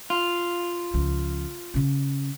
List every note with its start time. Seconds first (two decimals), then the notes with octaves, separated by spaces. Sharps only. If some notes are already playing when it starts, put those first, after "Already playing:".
0.10 F4
0.94 C#2 F3
1.74 C#3 C#4